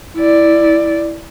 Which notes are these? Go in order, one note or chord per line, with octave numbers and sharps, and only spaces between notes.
E4 D5